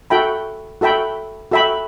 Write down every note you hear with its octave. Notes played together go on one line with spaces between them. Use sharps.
F#4 A4 E5 G5 B5
F#4 A4 E5 G5 B5
F#4 A4 E5 G5 B5